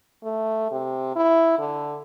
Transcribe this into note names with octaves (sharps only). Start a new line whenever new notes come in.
A3
C3
E4
D3